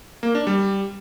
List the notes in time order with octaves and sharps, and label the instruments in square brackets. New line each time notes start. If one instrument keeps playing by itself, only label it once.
[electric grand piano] A#3
D4
G3